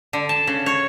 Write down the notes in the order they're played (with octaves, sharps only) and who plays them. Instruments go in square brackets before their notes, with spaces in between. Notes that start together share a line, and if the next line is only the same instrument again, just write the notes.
[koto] D3
A5
C#3
C#5